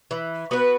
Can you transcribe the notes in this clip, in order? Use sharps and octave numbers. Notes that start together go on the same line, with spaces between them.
E3
B3 F#4 B4